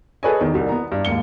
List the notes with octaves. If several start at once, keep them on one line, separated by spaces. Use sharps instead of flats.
G#4 A4 B4 C#5 D#5 G#5
E2 D#3
C2 G3
B3 A#5
G2
D#2 G#2 A#3 C#7 G7